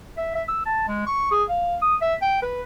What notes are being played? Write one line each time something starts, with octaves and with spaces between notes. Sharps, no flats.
E5
E5
E6
A5
G#3
C#6
G#4
F5
D#6
E5
G5
B4